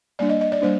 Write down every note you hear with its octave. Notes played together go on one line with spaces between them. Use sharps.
G3 A#3 D4 D5
D#5
D#5
D5
G3 A#3 D4 C5